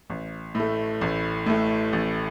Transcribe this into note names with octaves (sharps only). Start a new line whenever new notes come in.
A1
A2
A3
A1
A2 A3
A1